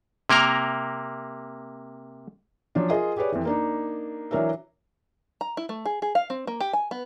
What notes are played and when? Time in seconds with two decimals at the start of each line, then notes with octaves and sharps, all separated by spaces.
0.29 C3 A#3 A#4 A#5
2.75 F3 F#3 C#4 D4
2.89 F4 G#4 A#4 D#5
3.17 G4 G#4 B4 C#5 D5
3.32 F2 E3
3.45 A#3 D4 D#4
4.31 E3 F#3 D4 A#4 C#5 E5
5.41 A#5
5.57 E4
5.69 A3
5.85 G#4
6.02 G#4
6.15 F5
6.30 C4
6.47 A#3
6.60 G4
6.73 G#5
6.91 B3